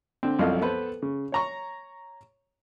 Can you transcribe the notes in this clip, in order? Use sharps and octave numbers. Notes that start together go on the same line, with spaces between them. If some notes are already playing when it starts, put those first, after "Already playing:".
D3 C4
C2 F#2 F3 A4 D#5 F5
B3 A4 B4 C5
C#3
C#5 A#5 C#6